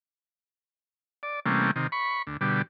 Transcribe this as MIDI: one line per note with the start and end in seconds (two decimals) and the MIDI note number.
1.23 1.40 74
1.46 1.71 48
1.46 1.71 52
1.46 1.71 55
1.46 1.71 57
1.46 1.71 58
1.46 1.71 61
1.76 1.87 48
1.76 1.87 51
1.92 2.22 83
1.92 2.22 85
2.27 2.37 38
2.41 2.62 47
2.41 2.62 50
2.41 2.62 55